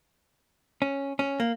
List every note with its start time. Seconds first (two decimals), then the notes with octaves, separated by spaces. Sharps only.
0.82 C#4
1.19 C#4
1.40 A#3